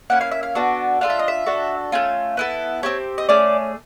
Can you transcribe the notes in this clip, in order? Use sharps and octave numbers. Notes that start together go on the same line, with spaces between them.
A#3 C#4 E4 F#5
F5
E5
F5
B3 D4 F#4 A4
D4 F4 A4 F5
E5
D#5
E5
D4 F#4 A4
A3 C#4 F4
B3 E4 A4
C4 E4 G4 C#5
D#5
A3 C#4 G#4 D5